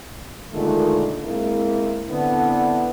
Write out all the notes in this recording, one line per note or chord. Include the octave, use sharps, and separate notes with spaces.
A#2 D3 D#3 G#3 A3
G#3 A#3 C4 E4
D3 B3 C4 D4 E4